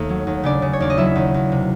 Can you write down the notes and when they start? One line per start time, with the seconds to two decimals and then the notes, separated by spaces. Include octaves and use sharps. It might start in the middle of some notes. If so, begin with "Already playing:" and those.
Already playing: D#2 A3 A4
0.09 F#3
0.27 D#2
0.43 C#3 D4 D5
0.62 C#3
0.73 C#5
0.80 D#2 D5
0.90 D#5
0.97 F#3 E4 E5
1.15 D#2
1.34 D#2
1.52 C3